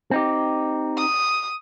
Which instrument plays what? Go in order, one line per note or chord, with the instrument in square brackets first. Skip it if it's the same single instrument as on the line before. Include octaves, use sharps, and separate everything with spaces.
[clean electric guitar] C4 D#4 G4
[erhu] D#6